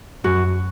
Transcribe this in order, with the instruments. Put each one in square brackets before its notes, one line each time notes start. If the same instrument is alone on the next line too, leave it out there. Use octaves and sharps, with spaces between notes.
[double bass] F#2 [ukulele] F#4